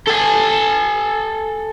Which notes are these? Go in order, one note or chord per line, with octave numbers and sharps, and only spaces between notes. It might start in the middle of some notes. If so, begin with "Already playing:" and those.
A4 G#5